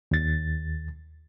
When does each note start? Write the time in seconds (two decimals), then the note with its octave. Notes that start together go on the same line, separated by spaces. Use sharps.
0.11 D#2 A6